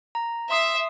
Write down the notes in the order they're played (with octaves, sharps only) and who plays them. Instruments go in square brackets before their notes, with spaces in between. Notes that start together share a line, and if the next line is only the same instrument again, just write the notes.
[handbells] A#5
[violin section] E5 [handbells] C6 D#6 C7